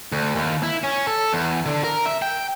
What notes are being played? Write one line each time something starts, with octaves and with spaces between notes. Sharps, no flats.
D2
D#2
E4
C#4
A4
E2
D3
A#4
E5
G5